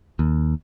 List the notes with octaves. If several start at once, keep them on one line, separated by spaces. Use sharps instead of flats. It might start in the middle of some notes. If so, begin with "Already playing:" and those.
D#2